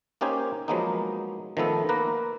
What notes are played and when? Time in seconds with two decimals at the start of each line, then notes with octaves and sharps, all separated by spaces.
0.21 A#3 C#4 D#4 G4 C5 G#5
0.68 F3 F#3 G#3 A#3 B3 D#4
1.57 D#3 F3 A3 B3 A4
1.89 A#3 B4 A#5